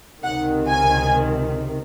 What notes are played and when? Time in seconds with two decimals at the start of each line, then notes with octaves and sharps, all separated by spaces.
0.23 C#2 C3 D#3 F#5
0.68 G#5